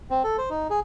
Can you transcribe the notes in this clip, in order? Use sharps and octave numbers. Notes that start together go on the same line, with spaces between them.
C4
A4
C5
D#4
G#4